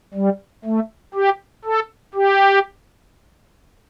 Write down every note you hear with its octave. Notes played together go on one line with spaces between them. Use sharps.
G3
A3
G4
A4
G4